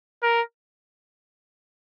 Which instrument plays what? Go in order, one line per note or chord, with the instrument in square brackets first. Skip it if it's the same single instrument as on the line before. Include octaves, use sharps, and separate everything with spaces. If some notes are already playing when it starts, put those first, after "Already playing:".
[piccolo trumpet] A#4